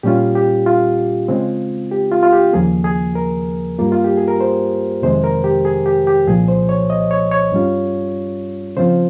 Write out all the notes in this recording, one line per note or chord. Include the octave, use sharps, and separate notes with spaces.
A#2 G3 C#4 F4 G4
G4
F4
C#3 G#3 C4
G4
F4
F4
G4
D#2 C#3 F3 A#3 G#4
G#4
A#4
G2 G3 A#3 F4
F4
G4
G#4
A#4
C5
F2 C3 D#3 G#3 C5
A#4
G4
G#4
G4
G4
C2 A#2 F3 G#4
C5
C#5
D#5
C#5
C#5
G2 G3 C#4 F4
C#3 F3 C4 F4 C5